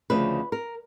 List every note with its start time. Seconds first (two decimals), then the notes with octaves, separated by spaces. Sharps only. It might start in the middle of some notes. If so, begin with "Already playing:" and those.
0.10 D2 C#3 F3 B4
0.52 A#4